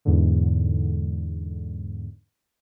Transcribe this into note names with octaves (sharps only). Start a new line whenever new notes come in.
E2 G#2 D3